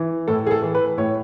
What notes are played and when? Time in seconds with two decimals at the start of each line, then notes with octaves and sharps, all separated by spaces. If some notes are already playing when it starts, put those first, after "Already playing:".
Already playing: E3
0.28 A2 A4
0.47 G#4
0.51 A4
0.62 E3
0.75 B4
0.98 A2 C#5